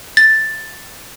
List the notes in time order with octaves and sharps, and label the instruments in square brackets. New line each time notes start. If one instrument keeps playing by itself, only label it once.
[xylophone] A6